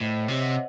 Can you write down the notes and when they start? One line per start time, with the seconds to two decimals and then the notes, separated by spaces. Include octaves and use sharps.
0.01 A2 C5 D#5
0.22 C#5 E5
0.28 C3
0.41 D#5 F#5